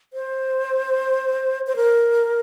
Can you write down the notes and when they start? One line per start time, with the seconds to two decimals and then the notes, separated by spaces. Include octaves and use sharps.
0.13 C5
1.67 C5
1.76 A#4